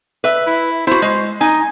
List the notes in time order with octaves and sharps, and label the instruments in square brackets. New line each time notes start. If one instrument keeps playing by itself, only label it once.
[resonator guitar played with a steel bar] B4 E5
[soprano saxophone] E4
[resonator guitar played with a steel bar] E4 F#4 [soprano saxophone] C5
[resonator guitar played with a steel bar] G#3
[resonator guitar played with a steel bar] D#4 [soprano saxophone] G#5